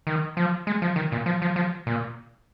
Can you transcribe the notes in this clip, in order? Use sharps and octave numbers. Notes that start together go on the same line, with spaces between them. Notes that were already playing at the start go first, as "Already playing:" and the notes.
D#3
F3
G#3
F3
D#3
A#2
F3
F3
F3
A#2